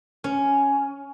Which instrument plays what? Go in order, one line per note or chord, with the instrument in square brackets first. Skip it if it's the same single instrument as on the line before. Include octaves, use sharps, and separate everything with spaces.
[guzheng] C#4